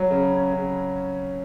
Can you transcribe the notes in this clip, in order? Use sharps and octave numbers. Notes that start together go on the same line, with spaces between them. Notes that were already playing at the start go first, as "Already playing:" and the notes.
Already playing: F#3
C#3
C#4
C#3